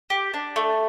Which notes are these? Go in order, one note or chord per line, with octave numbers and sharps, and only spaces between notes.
G4
D4
A3